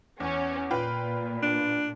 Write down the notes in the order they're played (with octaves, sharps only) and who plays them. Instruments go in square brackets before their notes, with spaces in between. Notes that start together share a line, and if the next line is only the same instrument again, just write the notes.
[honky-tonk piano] E2 [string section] C#4
[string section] A#2 [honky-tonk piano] F4 B4 G5
[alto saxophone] D4